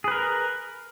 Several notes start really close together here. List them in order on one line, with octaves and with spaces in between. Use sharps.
G#4 B4 A#4